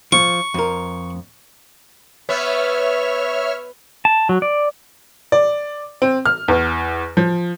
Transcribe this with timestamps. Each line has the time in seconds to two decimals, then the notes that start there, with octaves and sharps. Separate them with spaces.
0.12 F3 C#6
0.54 F2 A#4
2.29 B3 C#5 E5 F6
4.05 A5
4.29 F#3
4.42 D5
5.32 D5
6.02 C4
6.25 F6
6.48 E2
7.17 F3